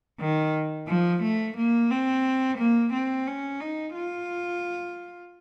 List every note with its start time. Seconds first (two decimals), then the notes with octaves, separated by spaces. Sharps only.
0.21 D#3
0.88 F3
1.22 A3
1.57 A#3
1.91 C4
2.58 A#3
2.93 C4
3.27 C#4
3.61 D#4
3.95 F4